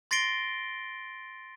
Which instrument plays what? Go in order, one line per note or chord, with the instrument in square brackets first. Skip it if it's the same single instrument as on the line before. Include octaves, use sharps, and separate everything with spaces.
[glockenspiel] C6 A6 A#6 C7 D7 G7